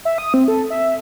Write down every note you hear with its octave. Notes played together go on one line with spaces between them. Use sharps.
E5
D#6
C4
A4
E5